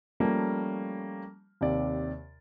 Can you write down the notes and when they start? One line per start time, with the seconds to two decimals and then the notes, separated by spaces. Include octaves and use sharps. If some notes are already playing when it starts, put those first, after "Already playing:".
0.20 F3 G3 A3 A#3 C#4
1.61 D#2 C3 D5